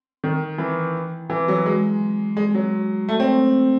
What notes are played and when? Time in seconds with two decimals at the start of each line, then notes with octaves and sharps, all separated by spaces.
0.24 D#3
0.58 E3
1.30 E3
1.48 F#3
1.66 G#3
2.37 G#3
2.55 F#3
3.09 A3
3.20 C4